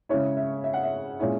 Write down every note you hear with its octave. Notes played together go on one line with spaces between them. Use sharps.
C#3 G#3 C#4 E4 C#5
E5
E5
F#5
E5
A#2 G#3 C#4 E4